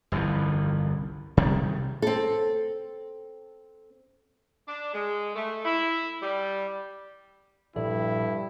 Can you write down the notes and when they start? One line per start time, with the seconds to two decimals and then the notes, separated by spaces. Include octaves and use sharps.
0.12 G1 C2 F2 E3
1.37 C3 D#3 G3
2.02 C4 A4
4.68 D4
4.94 G#3
5.36 A3
5.65 E4
6.22 G3
7.76 G2 A#2 F3 E4 A4 D5 E5